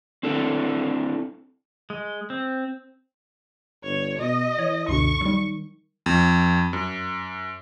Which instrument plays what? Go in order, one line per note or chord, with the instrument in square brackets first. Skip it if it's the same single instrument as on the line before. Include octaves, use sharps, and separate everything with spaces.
[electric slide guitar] C4 D4 E4 A4
[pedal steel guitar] G#3
C4
[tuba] G1 [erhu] C#5
[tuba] B2 [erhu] D#5
[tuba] E3 [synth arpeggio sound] C#5
[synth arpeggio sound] C#2 F#2 B2 [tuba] D3 [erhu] C#6
[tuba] D#3 [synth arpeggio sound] F#3 G3
[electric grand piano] F2
F#2